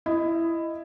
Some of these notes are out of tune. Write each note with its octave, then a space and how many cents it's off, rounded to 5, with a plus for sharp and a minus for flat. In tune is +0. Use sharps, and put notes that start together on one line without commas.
E4 +10 D#5 +0